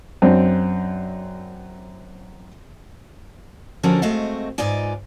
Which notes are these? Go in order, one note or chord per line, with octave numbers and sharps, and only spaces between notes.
F#2 C4 D4
D3 F3 C#4 F#4 A4 A#4
G#3 A3 C4 F#4 D#5 F5
G#2 D#4 F4 B4 D5 G#5